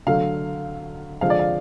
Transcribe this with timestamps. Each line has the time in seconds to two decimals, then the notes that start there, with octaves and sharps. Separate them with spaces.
0.07 D3 F#3 A3 F5
1.21 D3 F3 G#3 F5
1.30 D5
1.39 F5